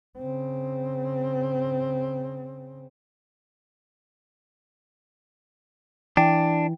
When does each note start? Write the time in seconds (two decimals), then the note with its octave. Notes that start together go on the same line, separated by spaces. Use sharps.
0.18 C#3 C4
6.17 E3 D4 G5